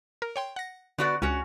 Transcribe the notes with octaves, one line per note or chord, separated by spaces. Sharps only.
A#4
C#5 G5 C6
F#5 A#6
D3 B3 F#4 D5
C#2 C#4 F#4